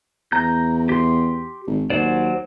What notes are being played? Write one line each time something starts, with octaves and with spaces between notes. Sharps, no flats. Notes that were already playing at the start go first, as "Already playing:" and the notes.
E2 A#5 G6
G4 C6
G#1
D#2 F#3 C5 D5